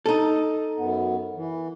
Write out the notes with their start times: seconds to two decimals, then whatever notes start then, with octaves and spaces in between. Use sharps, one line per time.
0.06 D#4 A4
0.77 F#2 B3
1.35 E3